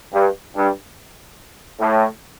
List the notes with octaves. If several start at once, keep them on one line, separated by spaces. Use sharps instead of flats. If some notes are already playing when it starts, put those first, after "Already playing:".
G2
G2
A2